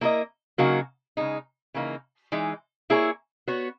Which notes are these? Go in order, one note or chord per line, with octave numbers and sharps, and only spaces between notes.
A#3 E4 A#4 D#5
C#3 F#3 A#3 D#4 F#4
C#3 G#3 D#4
C#3 E3 A#3 D#4
E3 G#3 D#4
A#3 E4 G#4 C#5
B3 F#4 C#5